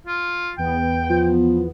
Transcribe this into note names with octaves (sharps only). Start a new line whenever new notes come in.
F4
E2 B3 G5
F3